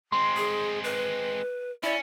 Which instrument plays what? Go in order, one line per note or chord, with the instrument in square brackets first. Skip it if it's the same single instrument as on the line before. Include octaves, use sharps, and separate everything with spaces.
[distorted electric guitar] G#3 C4 [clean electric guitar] C6
[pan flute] G#4
B4
[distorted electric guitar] C#4 [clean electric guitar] E4 [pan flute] D5